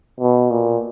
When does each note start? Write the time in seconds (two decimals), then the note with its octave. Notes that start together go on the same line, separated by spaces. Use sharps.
0.21 B2
0.51 A#2